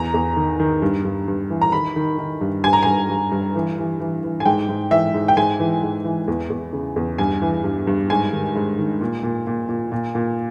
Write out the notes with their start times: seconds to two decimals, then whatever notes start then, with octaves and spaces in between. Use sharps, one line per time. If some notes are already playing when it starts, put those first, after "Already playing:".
Already playing: E2 A#5
0.14 E2
0.36 D#3
0.60 D#3
0.82 G2
1.05 G2
1.28 G2
1.50 E3
1.62 A#5
1.72 D#3 B5
1.96 D#3
2.18 D#3
2.41 G2
2.63 G2 G#5
2.73 A#5
2.83 G2 G#5
3.10 G2
3.32 G2
3.55 E3
3.78 E3
4.00 E3
4.23 E3
4.40 G#5
4.45 G#2 G5
4.69 G#2
4.91 E3 E5
5.14 G#2
5.28 G5
5.37 G#2 G#5
5.60 E3
5.83 G#2
6.05 E3
6.28 E2
6.50 E2
6.73 C#3
6.96 E2
7.18 G2 G#5
7.42 E3
7.64 G2
7.87 G2
8.10 G#2 G#5
8.33 D#3
8.55 G#2
8.79 D#3
9.01 A#2
9.23 A#2
9.47 A#2
9.69 A#2
9.92 A#2
10.15 A#2